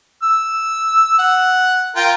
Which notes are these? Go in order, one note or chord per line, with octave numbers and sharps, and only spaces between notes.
E6
F#5
F4 A#4 G5